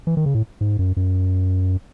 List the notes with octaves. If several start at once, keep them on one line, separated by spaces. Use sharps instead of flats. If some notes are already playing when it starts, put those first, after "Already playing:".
E3
D#3
C#3
A2
G#2
F#2
F#2